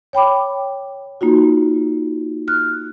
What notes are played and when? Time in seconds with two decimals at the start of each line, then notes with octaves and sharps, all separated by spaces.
0.13 C#5 G5 B5 D6
1.21 A#3 D#4 F4 F#4
2.48 F6 F#6